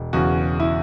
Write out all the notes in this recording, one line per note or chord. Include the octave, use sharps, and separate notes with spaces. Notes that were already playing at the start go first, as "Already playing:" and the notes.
Already playing: E1
E2 C#3 F#4
E4